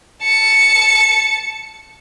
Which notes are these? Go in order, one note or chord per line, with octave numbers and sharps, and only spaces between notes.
A5 C#7